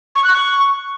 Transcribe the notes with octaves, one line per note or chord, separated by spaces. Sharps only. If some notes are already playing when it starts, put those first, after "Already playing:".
C#6
F#6
C#6